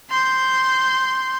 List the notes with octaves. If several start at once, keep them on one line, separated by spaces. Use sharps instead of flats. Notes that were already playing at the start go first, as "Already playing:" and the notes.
C6 G6